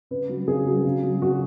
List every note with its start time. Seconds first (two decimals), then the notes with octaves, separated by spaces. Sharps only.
0.11 C#3 B4
0.29 F#3
0.48 C#3 G#4
0.66 F#3
0.85 C#3
1.03 F#3
1.22 C#3 F#4